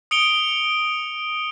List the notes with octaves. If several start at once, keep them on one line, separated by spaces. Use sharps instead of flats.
D#6 C#7 D7 F7 G7